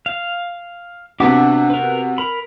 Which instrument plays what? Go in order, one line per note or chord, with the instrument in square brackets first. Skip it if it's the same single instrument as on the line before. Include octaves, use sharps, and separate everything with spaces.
[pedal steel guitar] F5
[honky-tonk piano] C3 B3 F#4 [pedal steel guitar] D4 E5 D6
[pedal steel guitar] A#4 B4
A#4 B5